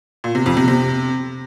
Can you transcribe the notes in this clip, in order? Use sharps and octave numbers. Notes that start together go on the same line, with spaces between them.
A#2
C3
F2
C3
C3